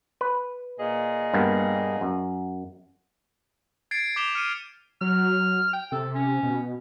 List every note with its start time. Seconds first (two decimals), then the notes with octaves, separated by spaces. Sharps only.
0.21 B4
0.79 A#2 G#4 D#5
1.34 G2 A#3 B3
2.01 F#2
3.91 G#6 A6 C7 D7
4.16 D6 G6 B6 E7 F7 G7
4.35 F6 C#7 D#7
5.01 F#3 F6
5.73 G5
5.92 C3 A4
6.14 C#4
6.43 B2